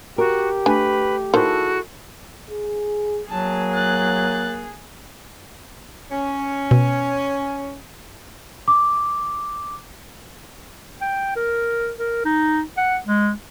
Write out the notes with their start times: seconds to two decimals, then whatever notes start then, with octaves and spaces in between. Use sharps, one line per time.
0.18 F#4 G4 A#4
0.66 A3 D4 B4 G#5
1.34 D#3 E4 F#4 G#4 A4 C5
2.51 G#4
3.30 F#3 A#3 G#4 A5
3.73 F#6 A6
6.12 C#4
6.71 B2
8.68 D6
11.01 G5
11.36 A#4
11.99 A#4
12.25 D#4
12.77 F#5
13.05 G#3